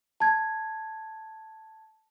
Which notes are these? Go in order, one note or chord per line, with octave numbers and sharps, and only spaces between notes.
A5 G#6